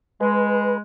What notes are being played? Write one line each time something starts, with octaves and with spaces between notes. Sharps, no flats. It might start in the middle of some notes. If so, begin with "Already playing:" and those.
G#3 B4